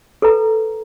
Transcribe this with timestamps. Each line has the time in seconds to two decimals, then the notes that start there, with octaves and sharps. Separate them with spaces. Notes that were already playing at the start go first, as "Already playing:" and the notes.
0.22 A4 B4 A#5